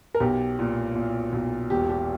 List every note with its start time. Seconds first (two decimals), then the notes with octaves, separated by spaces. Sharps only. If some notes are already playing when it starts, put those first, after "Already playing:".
0.14 A#4
0.20 B1 G4
0.59 A#2
0.95 A#2
1.33 B1
1.70 E1 G4
1.90 G4